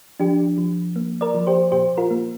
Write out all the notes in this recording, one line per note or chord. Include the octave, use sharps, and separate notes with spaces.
F3 D4 G4
F3
A#3
A#4 D5
F3
G4 C5
A#2 G4 C5
F4 A#4
A#3